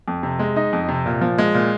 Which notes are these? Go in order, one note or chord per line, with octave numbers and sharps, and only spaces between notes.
F2
C3
G#3
D#4
F2
C3
A#2
F3
G#3
A#2